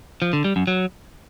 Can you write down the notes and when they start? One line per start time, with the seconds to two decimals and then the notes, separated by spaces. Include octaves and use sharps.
0.22 F3
0.33 D3
0.45 G3
0.56 F#2
0.67 F#3